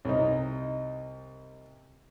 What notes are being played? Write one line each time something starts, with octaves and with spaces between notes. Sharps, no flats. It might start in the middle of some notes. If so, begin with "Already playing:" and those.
C2 D#4